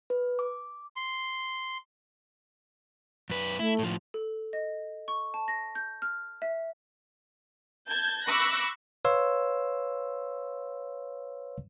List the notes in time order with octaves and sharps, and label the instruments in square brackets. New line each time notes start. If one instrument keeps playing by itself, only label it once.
[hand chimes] B4
D6
[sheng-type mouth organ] C6
[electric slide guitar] F#2 B4
[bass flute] A3 [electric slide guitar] E4
[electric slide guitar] A2 F3
[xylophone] A4
D#5
C#6
A5
A#6
G6
F6
E5
[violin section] A5 G6 G#6
B5 C#6 D6 E6 F#6 A#6
[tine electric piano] B4 C#5 F5 C6 E6